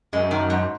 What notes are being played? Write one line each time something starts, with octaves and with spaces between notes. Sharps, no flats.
F#2 G#3
D#3
G#2